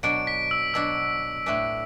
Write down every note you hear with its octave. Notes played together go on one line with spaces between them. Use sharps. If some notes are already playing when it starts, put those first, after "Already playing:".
B2 F#3 D4 D7
B6
E6
B2 F#3 D4 E6
A2 A3 D4 B4